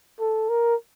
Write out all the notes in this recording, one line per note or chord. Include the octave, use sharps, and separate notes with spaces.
A4
A#4